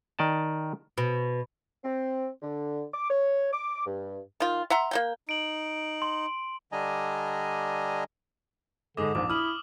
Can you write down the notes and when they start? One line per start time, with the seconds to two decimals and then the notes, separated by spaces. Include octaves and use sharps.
0.19 D#3 D5 D#5 A5
0.98 B2
1.84 C4
2.42 D3
2.93 D6
3.10 C#5
3.52 D6
3.86 G2
4.40 D#3 F4
4.70 E5 F#5 A#5 C6
4.91 A#3 D#4 G5
5.29 D#4 D7 F#7
6.02 C6
6.72 D3 G3 D4 D#5 G#5 A#5
8.97 G#2 D3 G#4 D#5 D6 D#6
9.15 A#1 G#2 D6
9.30 E4 D#6 F6 F#7